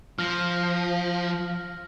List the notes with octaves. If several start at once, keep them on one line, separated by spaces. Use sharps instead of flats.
F3 F6 A#6